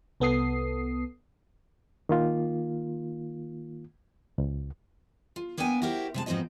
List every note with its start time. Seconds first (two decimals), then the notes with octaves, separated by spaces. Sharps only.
0.20 C2 B3 A4 D#6 C7
2.09 D#3 A#3 F4
4.38 C#2
5.36 F4
5.58 A#3 B3 D4 G5 G#5
5.82 E4 F#4 G4 A#4 C5
6.14 C3 G#3 A5
6.26 G#2 F3 B3 C4 F#4 D#5